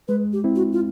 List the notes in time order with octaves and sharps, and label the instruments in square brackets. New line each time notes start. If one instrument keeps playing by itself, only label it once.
[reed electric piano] G#3 [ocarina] B4
[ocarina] G4
[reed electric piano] C4 E4
[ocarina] F#4
F4